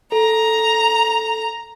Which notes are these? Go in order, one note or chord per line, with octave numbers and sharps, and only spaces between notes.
A4 A#5